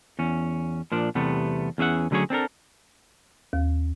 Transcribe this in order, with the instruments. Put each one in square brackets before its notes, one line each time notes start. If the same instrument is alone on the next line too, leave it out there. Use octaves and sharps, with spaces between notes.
[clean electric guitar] E2 C#4
A#2 F3 D4
E2 C3 G3 A3 B3
E2 C#4 G#4 E5 F#5
D2 D3 F#3 C#4 G#4 C#5
C4 D4 A4 A#4
[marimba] D#2